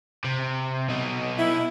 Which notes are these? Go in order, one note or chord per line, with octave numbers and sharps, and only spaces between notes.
C3
B2 D#4
E4